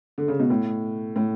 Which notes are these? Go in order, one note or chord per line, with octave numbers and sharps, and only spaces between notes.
D3
C#3
B2
A2
A2